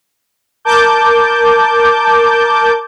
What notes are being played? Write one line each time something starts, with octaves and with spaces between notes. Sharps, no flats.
A#4 A5 D6 G6